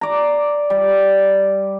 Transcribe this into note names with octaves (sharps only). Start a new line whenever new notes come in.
D5 A#5
G3